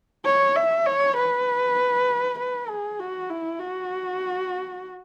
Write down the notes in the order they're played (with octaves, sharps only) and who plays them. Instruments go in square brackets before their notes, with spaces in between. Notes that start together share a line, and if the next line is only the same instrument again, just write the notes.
[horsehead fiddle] C#5
E5
C#5
B4
B4
G#4
F#4
E4
F#4